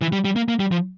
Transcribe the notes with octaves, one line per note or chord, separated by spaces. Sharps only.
E3
G3
G3
A#3
A#3
G3
F3